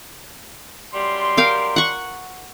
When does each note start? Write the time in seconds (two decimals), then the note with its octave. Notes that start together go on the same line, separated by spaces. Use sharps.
0.93 F#2 G3 C6
1.37 A#4 F5 G5
1.76 F#5 C#6